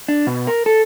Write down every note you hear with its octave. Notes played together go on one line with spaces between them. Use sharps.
D4
B2
A#4
A4